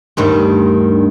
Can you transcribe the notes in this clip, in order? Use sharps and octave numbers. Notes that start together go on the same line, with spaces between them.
D2 G2 D#3